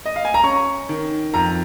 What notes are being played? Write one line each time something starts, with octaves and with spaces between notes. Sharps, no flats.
D#5
F5
G#5
A#5
C#4 C#6
D#3
F2 A#5